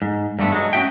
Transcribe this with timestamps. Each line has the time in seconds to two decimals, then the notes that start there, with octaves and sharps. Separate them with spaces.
0.02 G#2
0.39 G2 D3 A3 B3
0.52 F#3 G#3
0.73 C#4 D#4 F#4 E5 G5